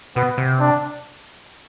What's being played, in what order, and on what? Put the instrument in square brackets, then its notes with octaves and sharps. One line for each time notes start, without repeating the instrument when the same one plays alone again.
[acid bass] B2 [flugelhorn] B3
[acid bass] C3
[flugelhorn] D4